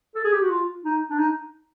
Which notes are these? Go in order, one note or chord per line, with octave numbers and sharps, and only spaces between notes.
A4
G#4
G4
F#4
F4
D#4
D4
D#4